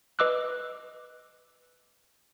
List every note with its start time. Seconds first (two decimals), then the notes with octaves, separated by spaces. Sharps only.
0.19 B4 D#5 D6 E6 F#6